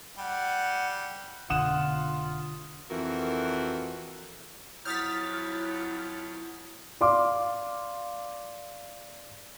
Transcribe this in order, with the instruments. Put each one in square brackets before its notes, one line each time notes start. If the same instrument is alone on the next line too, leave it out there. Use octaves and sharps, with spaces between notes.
[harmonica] G3 [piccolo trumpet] F#5
[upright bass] F1 B2 [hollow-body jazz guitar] D3 [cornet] F4 [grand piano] F#5 D#6 E7
[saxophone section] F2 E3 F#4 A#4
[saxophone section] F2 F#3 [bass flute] E4 [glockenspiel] D#6 G6 [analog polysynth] F6 A6 B6
[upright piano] D5 F5 C6 D6